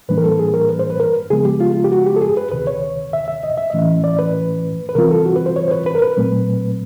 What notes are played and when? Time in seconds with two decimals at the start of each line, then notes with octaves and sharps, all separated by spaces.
0.08 A2 E3 G3 A#3 D4 B4
0.18 A#4
0.24 A4
0.39 G#4
0.54 A#4
0.69 B4
0.79 C5
0.90 B4
1.00 A#4
1.30 C#3 F3 G#3 B3 G#4
1.45 G4
1.60 F4
1.75 F4
1.84 G4
1.92 F#4
2.06 G4
2.16 A4
2.22 G#4
2.37 B4
2.52 D2 C3 D#3 B4
2.67 C#5
3.13 E5
3.28 E5
3.43 D#5
3.57 E5
3.70 A2 E3 A3 C#4 D#5
4.04 D5
4.19 B4
4.89 B4
4.95 C3 E3 G3 C4 F4 A#4
5.11 A4
5.26 F#4
5.36 B4
5.46 C5
5.56 C#5
5.68 C5
5.71 B4
5.86 B4
5.95 A#4
6.02 B4
6.17 A#2 F#3 A3 C4